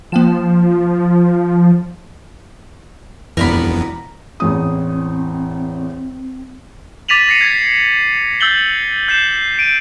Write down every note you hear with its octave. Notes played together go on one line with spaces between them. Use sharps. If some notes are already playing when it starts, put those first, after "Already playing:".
F3 A#3 G5 E7
E1 F2 E3 B3 A#4 D5 B5
A1 E2 C4 D#6
D6 A6 B6 D#7 F7 F#7
A#6 C7 C#7 D#7
G#6 A6 B6
E6 G6 A6 F#7 G7
G6 C7 E7
D7 D#7